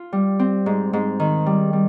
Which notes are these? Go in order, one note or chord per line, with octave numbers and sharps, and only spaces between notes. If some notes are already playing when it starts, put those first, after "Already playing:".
Already playing: F4
G3
C4
G#2
G#2
D#3
G3
G3